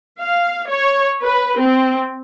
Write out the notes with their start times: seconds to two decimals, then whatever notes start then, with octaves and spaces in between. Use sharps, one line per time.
0.20 F5
0.69 C#5
1.22 B4
1.59 C4